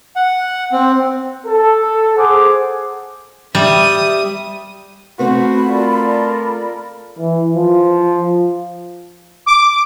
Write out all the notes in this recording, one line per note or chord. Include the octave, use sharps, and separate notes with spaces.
F#5
C4
A4
G#4 C5 F#5 G#5 D6
G3 E5 D#6
A3 C4 F#4 B4 B5
F4 A4 A#4 D5
E3
F3
D6